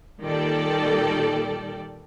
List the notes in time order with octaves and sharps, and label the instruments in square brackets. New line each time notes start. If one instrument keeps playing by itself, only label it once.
[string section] A#2 D#3 G3 A4 D5 G5